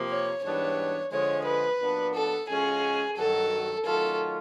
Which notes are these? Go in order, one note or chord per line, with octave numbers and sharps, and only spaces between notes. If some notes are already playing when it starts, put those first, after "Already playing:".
Already playing: C3 F3 A#3
C#5
G#2 E3 G3 B3 D4 C#5
D3 F3 G#3 C#5
B4
A#2 F#3 B3 D4
A4
C#3 F3 G#3 C#4 F#4 G#4
G2 D#3 F#3 A4
D#3 F#3 A3 C#4 F4 A4